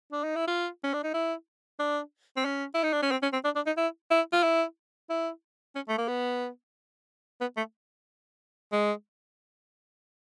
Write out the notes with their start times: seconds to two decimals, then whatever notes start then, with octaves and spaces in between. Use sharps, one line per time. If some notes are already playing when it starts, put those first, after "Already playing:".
0.12 D4
0.23 D#4
0.36 E4
0.47 F4
0.84 C#4
0.93 D4
1.03 D#4
1.14 E4
1.80 D4
2.37 C4
2.45 C#4
2.74 E4
2.84 D#4
2.93 D4
3.02 C#4
3.11 C4
3.22 C#4
3.33 C4
3.44 D4
3.56 D4
3.66 D#4
3.77 E4
4.11 E4
4.33 F4
4.43 E4
5.09 E4
5.75 C#4
5.88 A3
5.98 A#3
6.08 B3
7.41 B3
7.57 A3
8.72 G#3